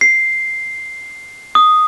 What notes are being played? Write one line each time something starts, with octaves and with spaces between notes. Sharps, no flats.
C7
D#6